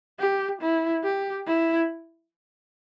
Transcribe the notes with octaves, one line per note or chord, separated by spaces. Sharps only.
G4
E4
G4
E4